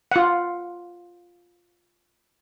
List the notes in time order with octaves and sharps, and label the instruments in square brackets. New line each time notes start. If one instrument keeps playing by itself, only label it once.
[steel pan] F4 F#5